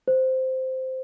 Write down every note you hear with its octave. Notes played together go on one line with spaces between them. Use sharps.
C5